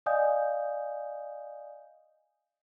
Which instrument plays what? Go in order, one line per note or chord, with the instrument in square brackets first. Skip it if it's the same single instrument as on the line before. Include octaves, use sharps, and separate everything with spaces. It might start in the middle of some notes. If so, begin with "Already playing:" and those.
[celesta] D5 D#5 F5 G#5 D#6 G6